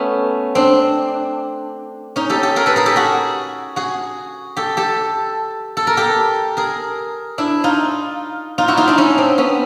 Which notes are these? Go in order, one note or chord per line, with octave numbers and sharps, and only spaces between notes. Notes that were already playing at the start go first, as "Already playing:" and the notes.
Already playing: A3 B3 C#4
C4 D4
C#4 D#4
G4 A4
G4 A4
G#4 A#4
A4 B4
G#4 A#4
G4 A4
F#4 G#4
F#4 G#4
G4 A4
G4 A4
A4
A#4
G4 A4
G#4 A#4
D4 E4
D#4 F4
D#4 F4
E4 F#4
D#4 F4
D4 E4
C#4 D#4
C4 D4
B3 C#4